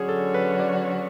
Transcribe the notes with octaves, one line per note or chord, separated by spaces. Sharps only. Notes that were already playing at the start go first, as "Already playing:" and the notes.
Already playing: D3 F#3 C#4 F#4 G#4 C#5
A4
B4
D5